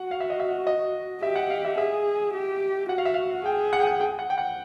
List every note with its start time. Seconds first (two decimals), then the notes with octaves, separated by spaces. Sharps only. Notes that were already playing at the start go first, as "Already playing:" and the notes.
Already playing: F#4 F#5
0.11 F5
0.20 E5
0.30 D#5
0.40 E5
0.67 D#5
1.22 G4 E5
1.36 F#5
1.50 F5
1.65 E5
1.78 G#4 E5
2.34 G4
2.89 F#4 F#5
2.98 F5
3.05 E5
3.14 F5
3.45 G#4 G5
3.73 F#5
3.80 G5
3.87 F#5
4.01 G5
4.19 F#5
4.30 G5
4.38 F#5